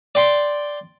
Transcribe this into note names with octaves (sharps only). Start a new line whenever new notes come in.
D5 G5 C6